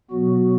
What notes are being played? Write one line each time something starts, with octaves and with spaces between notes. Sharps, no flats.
B2 F#3 B3 F#4